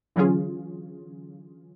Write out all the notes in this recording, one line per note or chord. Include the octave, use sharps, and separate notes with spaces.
D3 E3 F#3 C#4 F4 G#4